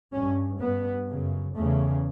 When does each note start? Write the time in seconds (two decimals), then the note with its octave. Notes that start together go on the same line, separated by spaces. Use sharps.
0.12 G2 C#4
0.60 G2 B3
1.08 F#2 C#3
1.55 E2 C#3 A3